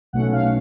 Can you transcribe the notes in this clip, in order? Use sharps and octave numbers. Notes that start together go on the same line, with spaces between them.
B1 B2 A3 C#4 F#5
F5